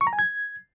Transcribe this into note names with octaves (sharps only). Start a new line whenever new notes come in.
C#6
A#5
G#5
G#6